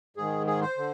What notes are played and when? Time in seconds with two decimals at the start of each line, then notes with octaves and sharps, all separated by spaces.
0.17 G#2 D#3 G#4
0.47 G#4
0.62 C5
0.78 D3